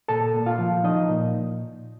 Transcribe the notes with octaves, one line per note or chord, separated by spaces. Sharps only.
A#2 A4 A5
A#2
F4 F5
F3
F3 D#4 D#5
A#2